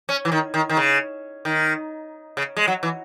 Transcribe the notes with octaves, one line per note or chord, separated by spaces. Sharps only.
C#4
E3
D#3
D#3
D#3
C#3
D#3
C#3
G#3
F#3
E3